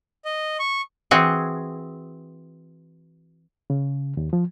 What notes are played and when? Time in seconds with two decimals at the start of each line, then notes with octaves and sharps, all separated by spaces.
0.25 D#5
0.60 C#6
1.11 E3 C4 F#4 G#4
3.70 C#3
4.17 D#2
4.33 F3